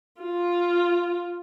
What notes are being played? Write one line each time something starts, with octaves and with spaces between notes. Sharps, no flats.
F4